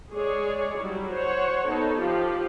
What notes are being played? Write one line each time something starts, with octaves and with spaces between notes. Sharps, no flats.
G#3 G#4 C#5 D5
F#3 G3 E4
C5 C#5 F#5
B3 D#4 A4 A5
F3 F4 G4